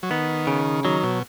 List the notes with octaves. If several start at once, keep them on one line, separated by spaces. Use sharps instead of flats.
F#3
D#3 B3
C#3
D#3 F#3
B2